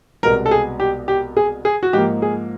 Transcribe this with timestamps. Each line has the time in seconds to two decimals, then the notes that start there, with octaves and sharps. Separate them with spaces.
0.23 C2 B2 G#3 B3 A#4
0.46 A4
0.51 G#4
0.80 G4
1.08 G4
1.37 G#4
1.65 G#4
1.83 F#4
1.93 G#2 F3 A#3 G4
2.22 G#4